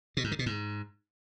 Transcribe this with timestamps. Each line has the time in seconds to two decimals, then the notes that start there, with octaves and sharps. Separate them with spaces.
0.17 B2
0.24 G#2
0.32 D3
0.39 B2
0.46 G#2